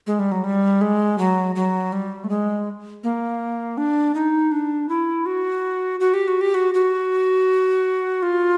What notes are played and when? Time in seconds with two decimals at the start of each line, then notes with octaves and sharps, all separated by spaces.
0.07 G#3
0.19 G3
0.32 F#3
0.44 G3
0.81 G#3
1.18 F#3
1.55 F#3
1.92 G3
2.24 A3
2.30 G#3
3.04 A#3
3.78 D4
4.15 D#4
4.52 D4
4.89 E4
5.26 F#4
6.00 F#4
6.14 G4
6.28 F#4
6.41 G4
6.54 F#4
6.74 F#4
8.22 F4